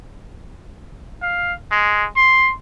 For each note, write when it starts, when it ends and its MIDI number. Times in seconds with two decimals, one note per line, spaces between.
1.22 1.53 77
1.71 2.05 56
2.16 2.52 84